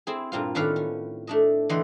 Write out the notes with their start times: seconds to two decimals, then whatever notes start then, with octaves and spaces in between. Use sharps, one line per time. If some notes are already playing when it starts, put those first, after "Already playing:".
0.07 C4 E4 G#4
0.32 G2 A#2 C4 F4
0.55 A2 D#3 C#4 B4 D5 F5
0.76 C#4
1.27 A3 D4 D#5
1.69 D3 E3 A3 D#5 G5 C6